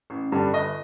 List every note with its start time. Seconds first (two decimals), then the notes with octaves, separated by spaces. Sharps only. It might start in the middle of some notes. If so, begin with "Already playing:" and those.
0.10 A1
0.32 G2 D3 G3 D4
0.53 G1 D#5